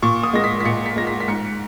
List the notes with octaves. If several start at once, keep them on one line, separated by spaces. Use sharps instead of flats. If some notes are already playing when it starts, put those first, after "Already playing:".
A#2 C#6
D#6
G#3 A#6
B6
B6
A#2 C#7
B6
G#3 A#6
B6
B6
G#2 C#7